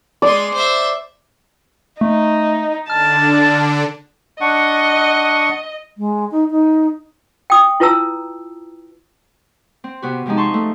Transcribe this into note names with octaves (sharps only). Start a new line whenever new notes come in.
G#3 D5 C6
C5 E5
A3 D#4
D3 D4 A5 F6
D4 D#5 F#5 C#6
G#3
D#4
D#4
G5 D#6
E4 F4 B4 A5 A#5 E6
C4
C3 B3 F#4
C3 F3 G#3 C4 D#4
A5 C6 C#6
A3